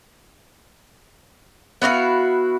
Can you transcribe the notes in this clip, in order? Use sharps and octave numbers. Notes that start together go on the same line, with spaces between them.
B3 E4 F#4 F5